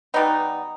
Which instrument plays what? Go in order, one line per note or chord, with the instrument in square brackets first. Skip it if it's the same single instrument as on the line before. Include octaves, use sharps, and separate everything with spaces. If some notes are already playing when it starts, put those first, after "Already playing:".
[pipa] B2 G3 B3 D#4